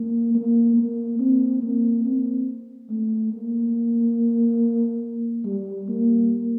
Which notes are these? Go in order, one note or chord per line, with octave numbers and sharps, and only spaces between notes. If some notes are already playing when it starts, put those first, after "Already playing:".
Already playing: A#3
A#3
A#3
C4
A#3
C4
A3
A#3
G3
A#3